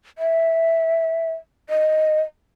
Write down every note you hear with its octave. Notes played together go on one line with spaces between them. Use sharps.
E5
D#5